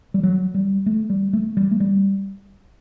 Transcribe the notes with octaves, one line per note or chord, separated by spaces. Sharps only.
G3
F#3
G3
A3
G3
A3
G3
A3
G3